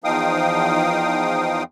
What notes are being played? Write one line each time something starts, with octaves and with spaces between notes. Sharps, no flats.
E2 F3 D#4 F5 G5 D#6